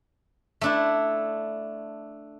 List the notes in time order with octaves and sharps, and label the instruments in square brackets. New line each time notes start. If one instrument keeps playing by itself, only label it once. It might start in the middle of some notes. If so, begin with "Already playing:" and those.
[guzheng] A3 D4 E4